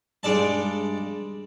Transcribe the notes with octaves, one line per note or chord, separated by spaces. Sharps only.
G2 G#3 D5 A5